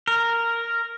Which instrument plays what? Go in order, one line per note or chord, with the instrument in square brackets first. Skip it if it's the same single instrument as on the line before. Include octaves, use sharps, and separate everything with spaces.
[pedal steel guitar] A#4